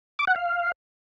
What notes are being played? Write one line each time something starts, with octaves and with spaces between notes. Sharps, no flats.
D6
F#5
F5